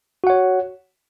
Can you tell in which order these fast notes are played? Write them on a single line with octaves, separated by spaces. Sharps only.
F#4 F#5 C#5